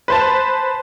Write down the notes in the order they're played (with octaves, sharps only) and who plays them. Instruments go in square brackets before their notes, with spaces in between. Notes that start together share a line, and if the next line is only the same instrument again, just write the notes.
[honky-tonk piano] B4 C5 A5